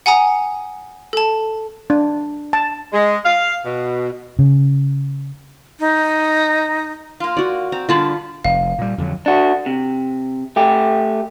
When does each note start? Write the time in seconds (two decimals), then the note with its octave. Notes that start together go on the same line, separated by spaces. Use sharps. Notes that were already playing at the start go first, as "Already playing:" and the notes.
0.06 F#5 G#5 A#5 D#6
1.13 A4 A5
1.90 D4
2.53 A5
2.93 G#3
3.25 F5
3.65 B2
4.39 C#3
5.80 D#4
7.20 A#3 F4
7.37 F#4 D5
7.72 C4 A#5
7.89 G2 A#2 D3 F4 A5 B5
8.45 F1 F5
8.78 A#2 G3
8.98 F2 D3 F#3
9.26 D4 F#4
9.66 C3
10.56 A3 G4